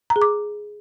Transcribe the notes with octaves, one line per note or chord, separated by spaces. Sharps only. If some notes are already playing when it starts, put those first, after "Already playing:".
A#5
G#4
D6